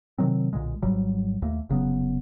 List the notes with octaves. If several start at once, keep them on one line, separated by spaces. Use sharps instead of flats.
C3 D#3 F#3 C4
B1 A#2 D3 G#3
G#1 G#2 F#3 G3
D#2 A3 A#3
F1 C#3 F#3 B3